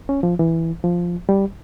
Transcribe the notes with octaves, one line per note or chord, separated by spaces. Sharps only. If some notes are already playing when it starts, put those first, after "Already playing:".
C#4
F3
E3
F3
G3